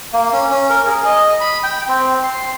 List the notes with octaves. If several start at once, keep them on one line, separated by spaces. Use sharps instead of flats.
A#3
C#4
C#4
A#4
G#4
D#5
B5
G5
C4
C6